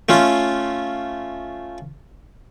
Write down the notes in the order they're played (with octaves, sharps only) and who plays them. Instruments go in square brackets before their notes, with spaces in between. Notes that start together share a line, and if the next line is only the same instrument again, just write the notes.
[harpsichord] A3 C#4 F4